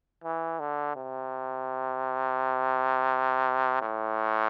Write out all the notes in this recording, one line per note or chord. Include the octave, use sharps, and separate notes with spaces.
E3
D3
C3
A2